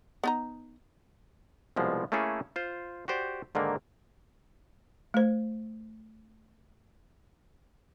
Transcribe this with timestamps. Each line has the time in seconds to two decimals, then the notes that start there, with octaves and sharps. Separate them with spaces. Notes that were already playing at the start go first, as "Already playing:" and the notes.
0.24 B3 D#4 A#5
1.76 C2 B2 F3 G#3
2.12 A3 A#3 C#4 E4 G#4 A4
2.56 F4 C5
3.08 F#4 G4 C5 D5
3.55 G#2 D3 D#3 A#3
5.14 A3 C5